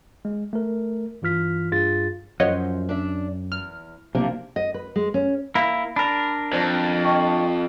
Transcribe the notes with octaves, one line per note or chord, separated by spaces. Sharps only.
G#3
A3 A#4
G2 E3 F4 F6 B6
G2 F4 G#4 A6
F#2 F3 C5 C#5 D#5 E5 F#5
D4 D5 E5
E2 F6
B1 C3 F3 A#3 D4
D#5
B4
G#3
C#4
A#3 E4
D4 A#4 B5
F2 C5 D5 A5
D#5 G5 C#6